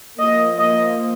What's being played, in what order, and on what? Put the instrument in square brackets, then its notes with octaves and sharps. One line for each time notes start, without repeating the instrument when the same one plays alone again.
[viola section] F3 A#3 D#5
D#5